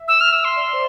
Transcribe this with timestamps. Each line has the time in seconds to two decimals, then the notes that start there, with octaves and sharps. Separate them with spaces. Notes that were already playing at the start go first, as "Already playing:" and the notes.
Already playing: E5
0.08 E6
0.21 F6
0.32 E6
0.45 C6
0.56 D5
0.73 C5